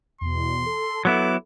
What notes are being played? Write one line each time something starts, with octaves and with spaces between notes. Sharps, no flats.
E2 B2 C6
A4
F#3 B3 E4 D6